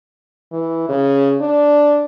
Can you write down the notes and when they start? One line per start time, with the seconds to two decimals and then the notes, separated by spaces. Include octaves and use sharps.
0.52 E3
0.89 C#3
1.41 D4